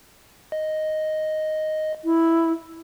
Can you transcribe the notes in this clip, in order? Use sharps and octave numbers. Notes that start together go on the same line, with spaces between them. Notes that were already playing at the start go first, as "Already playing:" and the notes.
D#5
E4